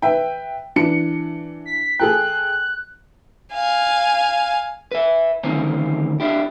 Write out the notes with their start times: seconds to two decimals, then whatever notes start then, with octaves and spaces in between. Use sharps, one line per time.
0.02 B4 E5 G5
0.76 E3 D4 C#7
1.66 B6
1.99 G#4 A4 G5 F#6
3.54 F5 G#5
4.91 B4 E5
5.44 D2 D#3 E3 C4 C#4
6.20 D4 E4 G4